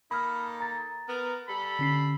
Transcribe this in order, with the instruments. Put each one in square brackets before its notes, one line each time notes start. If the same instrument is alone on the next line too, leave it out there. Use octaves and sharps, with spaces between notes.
[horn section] A#3 D#4 A4 [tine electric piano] B5 F6
[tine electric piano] A#5 A6
[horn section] B3 A#4
G3 A4 B5
[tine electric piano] D3 C#4 C7